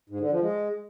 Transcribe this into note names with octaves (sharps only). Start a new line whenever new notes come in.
G#2
D3
F3
G#3